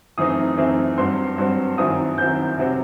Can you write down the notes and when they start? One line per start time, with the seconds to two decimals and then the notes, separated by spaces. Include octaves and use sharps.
0.18 F#2 E3 A3 C4 D#4 D#6
0.57 F#2 E3 A3 C4 D#4
0.98 G2 F#3 C4 C6
1.38 G2 F#3 C4
1.78 F#2 D#3 F#3 C4 E4 D#6
2.18 F#2 D#3 F#3 C4 E4 G6
2.58 C3 F#3 C4